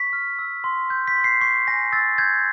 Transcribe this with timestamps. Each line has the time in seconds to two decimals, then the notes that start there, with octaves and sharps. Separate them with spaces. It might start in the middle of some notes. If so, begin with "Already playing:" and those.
Already playing: C#6 B6
0.13 F6
0.39 E6
0.64 C6
0.90 G6
1.08 B6
1.16 C6
1.24 C7
1.41 C#6 C7
1.67 G#5 A#6
1.92 E6 A6
2.18 G6 G#6